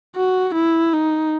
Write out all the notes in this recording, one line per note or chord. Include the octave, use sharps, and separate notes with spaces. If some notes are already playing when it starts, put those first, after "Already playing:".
F#4
E4
D#4